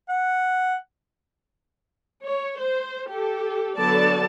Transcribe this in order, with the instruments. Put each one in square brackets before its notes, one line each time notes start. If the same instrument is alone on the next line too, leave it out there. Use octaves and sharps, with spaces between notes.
[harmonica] F#5
[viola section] C#5
C5
G4 A4
D3 F#3 B3 A4 D5 A5